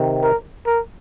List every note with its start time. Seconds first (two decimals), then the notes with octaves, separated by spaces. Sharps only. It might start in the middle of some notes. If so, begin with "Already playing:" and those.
Already playing: C3 D#3
0.23 A#4
0.66 A#4